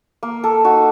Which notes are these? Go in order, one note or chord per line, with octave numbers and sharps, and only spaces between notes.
A#3
A4
D#4 F#4